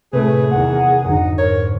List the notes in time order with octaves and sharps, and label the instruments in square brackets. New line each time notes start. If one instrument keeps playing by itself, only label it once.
[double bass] A2 A3 [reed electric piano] C3 [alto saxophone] G#4 [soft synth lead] B4
[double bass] E2 D#3 [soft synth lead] F#5
[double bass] G#1 D#4 [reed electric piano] F2 D3
[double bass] G#2 [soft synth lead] A#4 [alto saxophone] C#5